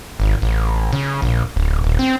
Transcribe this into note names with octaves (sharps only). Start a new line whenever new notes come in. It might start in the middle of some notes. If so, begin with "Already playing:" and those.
G#1
A1
C#3
A#1
D1
D#1
C4